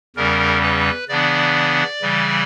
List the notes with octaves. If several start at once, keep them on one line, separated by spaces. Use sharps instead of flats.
E2 C#3 G3 C#4 A#4
B4
C#3 E3 B3 D4 D5
C#3 E3 G3